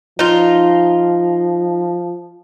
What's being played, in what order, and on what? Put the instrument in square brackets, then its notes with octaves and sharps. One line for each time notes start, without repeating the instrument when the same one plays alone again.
[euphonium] F3 [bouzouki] D#4 F4